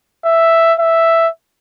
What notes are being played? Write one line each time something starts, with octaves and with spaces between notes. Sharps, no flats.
E5
E5